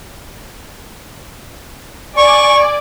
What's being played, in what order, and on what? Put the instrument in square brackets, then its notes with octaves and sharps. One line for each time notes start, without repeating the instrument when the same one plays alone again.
[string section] D5 G#5 D6 [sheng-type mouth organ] C#6